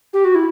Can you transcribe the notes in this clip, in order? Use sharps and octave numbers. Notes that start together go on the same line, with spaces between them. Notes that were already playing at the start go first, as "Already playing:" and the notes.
G4
F#4
E4